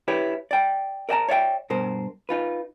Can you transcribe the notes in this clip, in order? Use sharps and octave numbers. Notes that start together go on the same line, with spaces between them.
E4 G4 B4 C#5
D5 G5
A#4 D5 D#5 G5 A5 A#5
C#5 D5 E5 F5 G5
G2 B2 A#4 C5
D#4 F4 B4